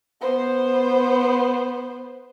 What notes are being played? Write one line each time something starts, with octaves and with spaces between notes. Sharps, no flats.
B3 C5